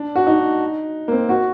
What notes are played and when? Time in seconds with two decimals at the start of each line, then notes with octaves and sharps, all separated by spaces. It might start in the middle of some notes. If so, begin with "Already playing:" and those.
Already playing: D4
0.16 F#4
0.27 D#4
1.08 A#3
1.12 C4
1.29 F#4